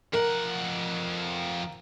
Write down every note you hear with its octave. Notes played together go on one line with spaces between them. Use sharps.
F2 A#4 F#5